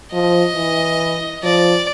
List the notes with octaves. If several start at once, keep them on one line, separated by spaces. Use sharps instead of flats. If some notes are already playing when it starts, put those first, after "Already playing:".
F3 D#5
E3
F3 D5